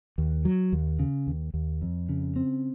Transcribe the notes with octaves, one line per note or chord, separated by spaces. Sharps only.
D#2
F#3
D#2
C#3
D#2
D#2
F2
C#3
C4